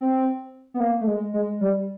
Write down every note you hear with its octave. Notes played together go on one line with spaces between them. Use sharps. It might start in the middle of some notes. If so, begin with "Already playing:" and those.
C4
B3
A#3
A3
G#3
G#3
G3